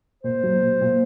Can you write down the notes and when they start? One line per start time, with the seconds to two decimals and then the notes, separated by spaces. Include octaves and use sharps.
0.23 A#2 C5
0.44 F#3
0.62 A#2
0.81 A#2